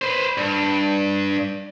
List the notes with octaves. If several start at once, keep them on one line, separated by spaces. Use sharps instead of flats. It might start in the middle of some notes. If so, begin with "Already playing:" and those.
B4 C5
G2